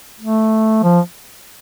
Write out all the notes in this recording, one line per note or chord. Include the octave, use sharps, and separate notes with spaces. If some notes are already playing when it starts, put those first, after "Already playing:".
A3
F3